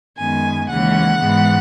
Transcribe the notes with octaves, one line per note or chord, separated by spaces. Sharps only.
F#2 D#3 G#3 B3 G#5
D#2 C#3 E3 G#3 C#4 F#5
G#2 E3 G#3 B3